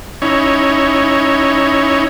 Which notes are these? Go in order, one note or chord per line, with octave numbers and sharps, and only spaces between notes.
C#4 D#4 E4 C#5